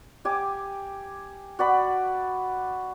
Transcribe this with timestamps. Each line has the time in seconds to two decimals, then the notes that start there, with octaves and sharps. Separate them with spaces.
0.25 G4 G#5 D6
1.59 F#4 D5 B5